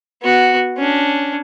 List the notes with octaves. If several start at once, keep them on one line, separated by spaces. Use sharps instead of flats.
B3 F#4
C#4 D4